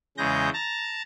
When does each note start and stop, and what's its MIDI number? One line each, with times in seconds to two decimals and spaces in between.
0.17 0.49 40
0.17 0.49 49
0.17 0.49 56
0.17 0.49 91
0.17 0.49 94
0.53 1.02 81
0.53 1.02 82